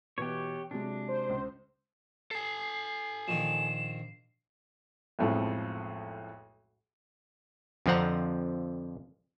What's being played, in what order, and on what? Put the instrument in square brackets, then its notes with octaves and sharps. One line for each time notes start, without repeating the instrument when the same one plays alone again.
[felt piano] B2 E3 [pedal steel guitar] G4 C#5
[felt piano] C3 F#3 G#3 [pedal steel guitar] D4
[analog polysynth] C5
[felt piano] C#2
[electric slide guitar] A4 G#5 [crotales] C7
[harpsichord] A#1 D#3 [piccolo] E7
[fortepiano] B1 F2 A2 F3 G#3 A4
[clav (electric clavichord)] F2 D3 F3 C4 F#5 A#5